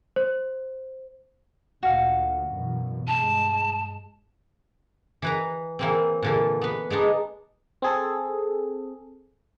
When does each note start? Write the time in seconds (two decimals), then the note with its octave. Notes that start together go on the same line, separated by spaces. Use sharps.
0.16 C5
1.83 D2 A#2 F#4 F5
2.53 F#2 B2 E3
3.08 G2 G#3 A5
5.22 E3 B4 A#5
5.79 E3 A#3 C4
6.22 A#2 D3 E3
6.61 B3 B4
6.90 G#3 B3 D4 D#4
7.82 C4 G#4 A4